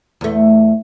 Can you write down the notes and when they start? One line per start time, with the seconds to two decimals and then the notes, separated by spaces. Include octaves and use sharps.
0.21 E2 A3